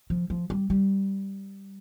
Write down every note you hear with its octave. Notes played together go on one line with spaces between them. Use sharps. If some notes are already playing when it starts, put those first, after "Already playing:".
F3
F3
G3
G3